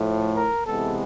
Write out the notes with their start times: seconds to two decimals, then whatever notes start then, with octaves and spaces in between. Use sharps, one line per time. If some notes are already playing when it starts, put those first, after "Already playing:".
Already playing: A2 F3 A3
0.35 A#4
0.66 C3 E3 G#3 B3 A4